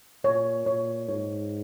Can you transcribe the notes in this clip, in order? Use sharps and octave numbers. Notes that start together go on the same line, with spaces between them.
A#2 C#5
A#2 C#5
G#2 C#5